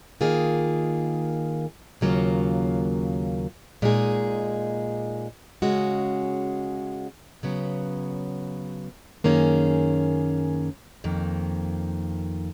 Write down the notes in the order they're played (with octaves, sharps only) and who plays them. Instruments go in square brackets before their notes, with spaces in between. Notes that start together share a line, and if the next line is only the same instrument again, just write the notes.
[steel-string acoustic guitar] D#3 A#3 F4 G#4
D#2 C#3 F#3 A#3 F4
A#2 G#3 D#4 G#4
C#3 G#3 C#4 F#4
C#3 F#3 B3
F#2 D#3 A#3 C#4 G#4
F2 D#3 A#3